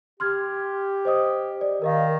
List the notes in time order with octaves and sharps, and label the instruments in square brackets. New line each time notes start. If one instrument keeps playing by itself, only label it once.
[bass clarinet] G4 [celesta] C6 F6 G#6
[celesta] C5 D#5 D#6
D5
[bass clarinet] D#3 [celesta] A#4 D#5 F5